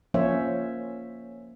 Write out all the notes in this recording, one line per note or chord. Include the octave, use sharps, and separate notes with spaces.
F3 A#3 C#4 C5 C#5 E5